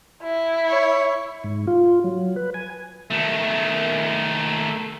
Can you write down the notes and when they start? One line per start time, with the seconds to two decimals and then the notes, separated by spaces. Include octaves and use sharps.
0.23 E4
0.68 C#5
1.44 G#2
1.67 F4
2.04 F#3
2.36 B4
2.54 G#5
3.10 D#3 A3